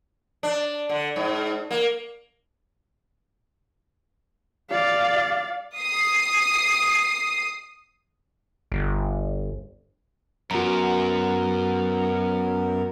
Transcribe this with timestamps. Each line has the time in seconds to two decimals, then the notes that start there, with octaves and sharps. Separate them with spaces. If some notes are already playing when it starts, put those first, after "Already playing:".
0.43 D4
0.89 D3
1.16 G#2
1.71 A#3
4.70 D5 F5
5.79 D#6 C7
8.72 G1
10.51 F#2 B3 F#4 A#4 A#5